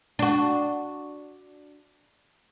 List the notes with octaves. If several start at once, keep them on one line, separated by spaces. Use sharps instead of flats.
D4 F#4